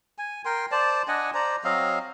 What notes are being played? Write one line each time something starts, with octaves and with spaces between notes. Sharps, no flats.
G#5
A#4 G5 C6
C5 D5 A5
D4 D#5 F#5 G#5
C5 D5 A#5
F#3 C4 D#5 F5